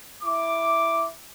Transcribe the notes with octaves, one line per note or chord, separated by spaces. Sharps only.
E4 D6